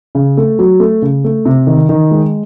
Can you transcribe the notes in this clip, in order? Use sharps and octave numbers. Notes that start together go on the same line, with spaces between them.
C#3
A3
F#3
A3
C#3
A3
C3
D#3
D#3
G#3